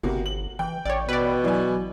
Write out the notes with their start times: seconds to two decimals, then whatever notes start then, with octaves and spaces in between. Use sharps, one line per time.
0.03 G1 C3 A#3 F#4
0.26 F#7
0.59 E3 G5
0.85 A1 C#5 D5
1.09 B2 B4 D5
1.44 E3 F#3 D5 G#5